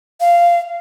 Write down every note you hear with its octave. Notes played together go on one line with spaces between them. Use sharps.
F5